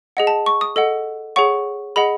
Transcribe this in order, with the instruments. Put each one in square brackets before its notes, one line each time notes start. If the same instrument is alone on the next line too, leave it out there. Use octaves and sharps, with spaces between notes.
[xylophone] G#4 D#5 F#5
A5
C#6
D#6
A4 D#5 F#5
G#4 C#5 F#5 C#6
G#4 D#5 F#5 B5